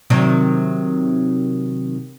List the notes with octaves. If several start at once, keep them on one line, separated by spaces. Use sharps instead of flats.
C3 D#3 F#3